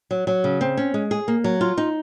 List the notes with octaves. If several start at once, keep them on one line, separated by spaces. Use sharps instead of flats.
F#3
F#3
C#3
C4
C#4
G#3
G#4
A#3
F#3
F4
D#4